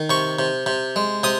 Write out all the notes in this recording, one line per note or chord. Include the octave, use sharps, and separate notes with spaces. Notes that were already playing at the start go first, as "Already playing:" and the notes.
Already playing: D#3
C3 C#6
C3
C3
G#3
C3 D#6